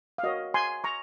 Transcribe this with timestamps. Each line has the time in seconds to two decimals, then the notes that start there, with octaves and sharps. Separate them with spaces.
0.18 F5
0.23 F#4 A#4 C#5 D#5
0.54 G#5 C6
0.84 A#5 C#6